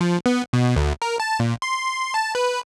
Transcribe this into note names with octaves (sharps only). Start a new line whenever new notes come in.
F3
B3
B2
D2
A#4
A5
A#2
C6
A5
B4